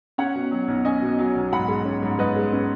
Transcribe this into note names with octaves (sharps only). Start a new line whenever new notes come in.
C#4 C#5 F#5
B2
F#3
B1
C#4 D#5 G#5
B2
F#3
B1
G#2 F#5 B5
G#3
C#4
G#2
G#2 B4 D#5
G#3
C#4